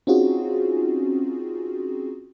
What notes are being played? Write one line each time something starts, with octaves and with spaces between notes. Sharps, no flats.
C4 C#4 D#4 F4 F#4 G#4